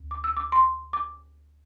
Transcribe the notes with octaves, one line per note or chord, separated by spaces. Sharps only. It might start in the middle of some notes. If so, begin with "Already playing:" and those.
Already playing: D2
D6
E6
D6
C6
D6